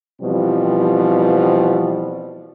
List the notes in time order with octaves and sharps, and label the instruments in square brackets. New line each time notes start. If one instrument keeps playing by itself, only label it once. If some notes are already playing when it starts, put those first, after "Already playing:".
[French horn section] B2 E3 F3 G3 C4